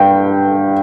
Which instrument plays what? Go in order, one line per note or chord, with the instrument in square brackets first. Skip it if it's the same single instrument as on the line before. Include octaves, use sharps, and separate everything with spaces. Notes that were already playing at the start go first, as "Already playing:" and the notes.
Already playing: [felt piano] G2 G5